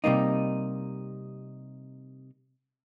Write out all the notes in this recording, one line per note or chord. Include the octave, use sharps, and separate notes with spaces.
C3 G3 A#3 D#4